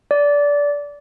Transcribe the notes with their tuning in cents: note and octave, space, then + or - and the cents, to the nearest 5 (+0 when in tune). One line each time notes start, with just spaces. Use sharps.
D5 -20